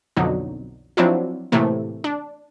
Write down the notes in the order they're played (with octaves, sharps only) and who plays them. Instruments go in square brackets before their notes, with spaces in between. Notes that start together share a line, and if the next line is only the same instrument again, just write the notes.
[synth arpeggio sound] B1 F2 D3 F#3 D#4
F3 F#3 C4 D4 E4 F4
A2 C3 E3 A3 A#3
D4